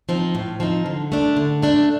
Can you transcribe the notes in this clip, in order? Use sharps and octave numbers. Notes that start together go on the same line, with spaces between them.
F3 C4 D#4
A2
F3 C4 D#4
D3
A3 D4
D3
A3 D4